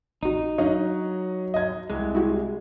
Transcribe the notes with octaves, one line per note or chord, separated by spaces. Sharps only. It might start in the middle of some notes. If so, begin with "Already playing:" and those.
A1 D#4 F#4
F#3 D4 D#4 C#5 D#5 F5
D#5 G#6
C2 G#3
E4 F#4 G4